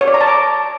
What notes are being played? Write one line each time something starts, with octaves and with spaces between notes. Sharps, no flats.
C#5
D5
A#5
A5
D6